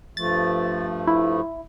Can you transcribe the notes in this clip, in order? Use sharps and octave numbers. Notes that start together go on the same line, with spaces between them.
G2 F3 A3 A6
E4